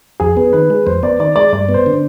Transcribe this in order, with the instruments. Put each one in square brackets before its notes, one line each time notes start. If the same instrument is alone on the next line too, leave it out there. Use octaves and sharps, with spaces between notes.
[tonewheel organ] F2 [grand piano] G#4
[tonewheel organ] B3
[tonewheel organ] D#3 [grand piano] B4
[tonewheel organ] G#3
[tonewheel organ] F2 [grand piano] C5
[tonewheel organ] B3 [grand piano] D5
[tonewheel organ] D#3 [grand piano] D5
[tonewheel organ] G#3 [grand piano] D5
[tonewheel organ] G2 [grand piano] D5
[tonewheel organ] B3
[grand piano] C5
[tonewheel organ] D3